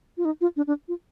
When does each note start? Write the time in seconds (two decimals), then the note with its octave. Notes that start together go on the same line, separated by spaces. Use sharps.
0.17 F4
0.25 D#4
0.41 F4
0.57 D4
0.67 D4
0.88 F4